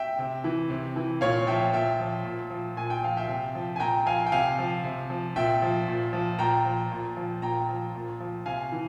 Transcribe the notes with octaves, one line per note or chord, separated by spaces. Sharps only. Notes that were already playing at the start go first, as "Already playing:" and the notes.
Already playing: E5 G5
C3
E3
C3
E3
A#2 C#5 F5
F3 E5 G5
A#2 E5 G5
F3
A#2
F3
A#2 G#5
G5
F3 F5
E5 G5
C3
F3
G#5
A#2 G5 A#5
F3 F5 G#5
G5
C3 F5 G#5
F3
C3
F3
A#2 E5 G5
F3
A#2
F3
A#2 G5 A#5
F3
A#2
F3
A#2 G5 A#5
F3
A#2
F3
C3 F5 G#5
E3